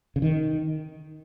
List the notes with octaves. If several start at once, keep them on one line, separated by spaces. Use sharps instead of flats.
C#3
D#3